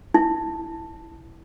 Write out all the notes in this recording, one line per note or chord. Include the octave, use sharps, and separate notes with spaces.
E4